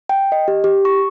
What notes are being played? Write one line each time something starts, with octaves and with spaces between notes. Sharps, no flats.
G5
D#5
G4
G4
C#6